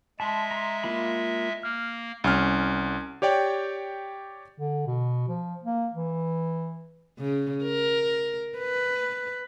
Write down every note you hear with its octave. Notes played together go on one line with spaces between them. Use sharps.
G#3 E5 A5 B5 C6
A#5 C6
A#3 F4 B5
A#3 F6
C2 C#4 F6
G4 C#5 D5 G5
D3
B2
F3
A#3
E3
C#3
A#4
B4